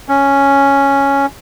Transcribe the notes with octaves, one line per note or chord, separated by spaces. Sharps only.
C#4